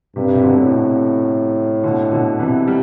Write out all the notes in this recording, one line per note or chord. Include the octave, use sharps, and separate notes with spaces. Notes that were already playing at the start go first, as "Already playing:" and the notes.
G2 C3
C3
B2 D3
A2
C3
B2 D3
B2 D3
C3 E3
G3